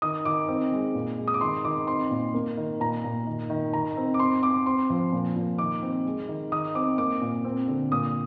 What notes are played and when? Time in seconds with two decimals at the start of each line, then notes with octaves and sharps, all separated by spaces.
0.02 D#3 D#6
0.25 D#3 D6
0.48 C4
0.72 G#3
0.95 A#2
1.18 G#3
1.28 D#6
1.34 D6
1.41 D#3 C6
1.64 D#3 D6
1.87 C4 C6
2.11 A#2
2.34 A#3
2.57 D#3
2.80 A#2 A#5
3.04 A#2
3.27 D#3
3.50 D#3
3.73 D#3 A#5
3.97 C4
4.14 D6
4.19 C4 C6
4.43 C4 D6
4.66 C4 C6
4.90 F3
5.13 A#2
5.36 A#2
5.58 D#3 D6
5.83 C4
6.05 G#3
6.29 D#3
6.52 D#3 D#6
6.75 C4 D6
6.98 A#3 D6
7.22 A#2
7.44 C4
7.68 D3
7.92 A#2 D#6